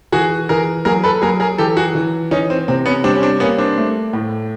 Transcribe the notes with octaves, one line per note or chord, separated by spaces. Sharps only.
E3 F#4 G#4
E3 G#4 A#4
F#3 G#4 A#4
A4 B4
F#3 G#4 A#4
G#4 A#4
E3 G4 A4
F#4 G#4
E3
E3 C#4 D#4
C4
C3 C4
B3 C#4
G3 C4 D4
C#4
C4 D4
A#3 B3 C#4
C4 D4
A3
A2